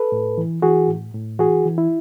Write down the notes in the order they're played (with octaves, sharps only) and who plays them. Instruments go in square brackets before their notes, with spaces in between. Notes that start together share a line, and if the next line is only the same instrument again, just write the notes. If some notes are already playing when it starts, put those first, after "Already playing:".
Already playing: [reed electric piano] A4 B4
A2
E3
E3 F#4 G#4
A2
A2
E3 F#4 G#4
E3
E4